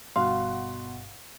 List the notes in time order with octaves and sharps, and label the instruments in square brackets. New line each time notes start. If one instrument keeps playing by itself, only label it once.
[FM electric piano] G1 G2 F#5 [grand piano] B2 [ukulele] F5 [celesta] C6